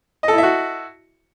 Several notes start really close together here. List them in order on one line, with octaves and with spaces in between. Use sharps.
D#5 A4 E4 E5 F#4